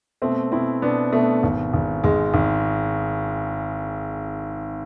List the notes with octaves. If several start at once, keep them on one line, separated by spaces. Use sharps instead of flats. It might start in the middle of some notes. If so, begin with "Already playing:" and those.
B2 A3 C4
B2 C4 E4
B2 B3 D4
B2 A3
G#1
G#1
G#1 G#3
G#1